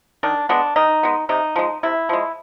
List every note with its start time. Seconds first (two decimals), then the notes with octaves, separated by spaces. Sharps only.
0.23 D#3 D4
0.49 G#3 B3 D4
0.76 D#3 D#4
1.03 G#3 B3
1.29 C3 D#4
1.56 F3 G#3
1.83 C3 E4
2.09 F3 G#3